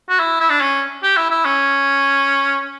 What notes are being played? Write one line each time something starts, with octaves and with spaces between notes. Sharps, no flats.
F#4
E4
E4
D4
C#4
G4
E4
E4
C#4